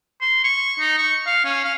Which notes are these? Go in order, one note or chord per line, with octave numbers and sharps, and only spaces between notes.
C6
C#6
D#4
C#6
F5
C#4
F5